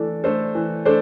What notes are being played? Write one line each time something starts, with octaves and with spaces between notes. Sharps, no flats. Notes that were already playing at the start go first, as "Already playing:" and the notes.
Already playing: E3 A3 D4 A4
A3 D4 A4 C5
E3
A3 D4 A4 C5